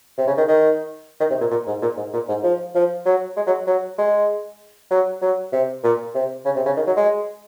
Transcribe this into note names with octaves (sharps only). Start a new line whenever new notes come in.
C3
C#3
D#3
D#3
D#3
C3
A#2
A#2
G#2
A#2
G#2
A#2
G#2
F3
F3
F#3
G#3
F#3
F#3
G#3
F#3
F#3
C3
A#2
C3
C#3
C3
C#3
D#3
F#3
G#3